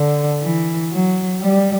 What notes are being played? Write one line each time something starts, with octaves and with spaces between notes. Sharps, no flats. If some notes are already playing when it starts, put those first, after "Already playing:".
Already playing: D3
E3
F#3
G3